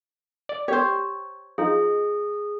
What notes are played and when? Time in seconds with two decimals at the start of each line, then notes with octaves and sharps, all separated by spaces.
0.49 D5
0.68 G4 C5 C#5
1.58 F3 D#4 G#4